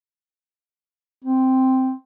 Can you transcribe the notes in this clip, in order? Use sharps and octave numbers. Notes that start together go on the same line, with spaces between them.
C4